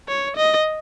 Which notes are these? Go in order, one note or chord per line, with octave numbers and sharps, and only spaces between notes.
C#5
D#5